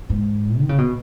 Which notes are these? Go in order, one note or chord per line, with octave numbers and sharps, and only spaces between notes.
G#2
D#3
C#3
B2